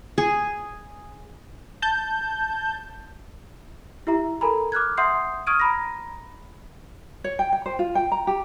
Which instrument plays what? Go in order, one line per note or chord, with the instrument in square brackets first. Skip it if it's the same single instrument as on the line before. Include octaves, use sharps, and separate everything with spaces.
[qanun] G#4
[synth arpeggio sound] A5 G6
[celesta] E4 G4 E5 A#5
A4 A#4 G#5 A#5 B5
D6 F6 F#6 G#6
E5 F#5 C6 D#6 G6 C7
C#6 D#6 F6 G#6 D7 D#7
A#5 B5 A#6
[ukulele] C#5
G5
G5
C5
F4
G5
A#5
G4